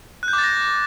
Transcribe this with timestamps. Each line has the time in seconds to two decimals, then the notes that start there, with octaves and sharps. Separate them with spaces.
0.23 F#6
0.28 G6
0.33 D6
0.38 A6
0.44 A#6